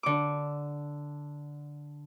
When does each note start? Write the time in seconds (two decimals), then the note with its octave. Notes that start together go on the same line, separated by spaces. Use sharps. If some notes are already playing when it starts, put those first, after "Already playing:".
0.03 D3 D6